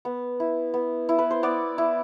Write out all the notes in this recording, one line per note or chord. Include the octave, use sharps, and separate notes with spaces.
B3
E4
B3
E4
B4
C5
B3 D5
E4